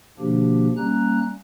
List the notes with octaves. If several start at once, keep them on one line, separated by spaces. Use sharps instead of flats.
B2 D3 F3 A#3 D4 G4
G3 A#3 C#4 A#5 F#6